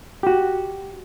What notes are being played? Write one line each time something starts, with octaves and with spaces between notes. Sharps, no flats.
F#4 G4